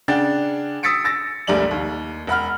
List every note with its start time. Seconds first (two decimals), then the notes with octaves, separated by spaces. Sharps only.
0.08 C#3 D4 F#5 G5 A6
0.83 D#6 E6 A6 B6 C#7 D7
1.04 E6 A6 A#6
1.47 E1 A#1 G3 A3 D5 F#7
1.71 D#2
2.27 E1 F#5 B5 F6